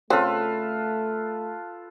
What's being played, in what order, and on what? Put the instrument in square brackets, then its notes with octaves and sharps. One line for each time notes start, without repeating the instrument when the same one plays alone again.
[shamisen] C#3 C4 [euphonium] A3 [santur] F4 A4 B4